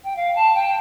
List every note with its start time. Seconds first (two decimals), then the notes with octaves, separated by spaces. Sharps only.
0.03 G5
0.15 F5
0.35 A5
0.54 G5